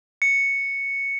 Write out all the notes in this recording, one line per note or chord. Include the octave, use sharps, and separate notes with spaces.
C#7